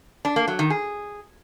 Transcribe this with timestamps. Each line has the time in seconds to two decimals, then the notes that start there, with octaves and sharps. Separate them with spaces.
0.25 D4
0.36 A#3
0.48 F#3
0.59 D#3
0.70 G#4